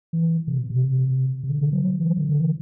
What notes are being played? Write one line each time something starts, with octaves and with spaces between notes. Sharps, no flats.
E3
C3
B2
C3
C3
D3
D3
F#3
F#3
E3
D3
D3
E3